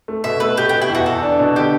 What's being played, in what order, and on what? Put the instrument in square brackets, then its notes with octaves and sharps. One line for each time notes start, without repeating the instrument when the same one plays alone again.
[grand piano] A3
[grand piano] B2 [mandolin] E5
[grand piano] A3 [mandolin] B4
[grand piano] B2 [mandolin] G4
[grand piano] B2 [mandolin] G4
[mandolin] E4
[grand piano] E2 [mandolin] F#4
[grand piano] E2 [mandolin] A4
[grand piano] D4
B2
[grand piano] D3 [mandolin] G4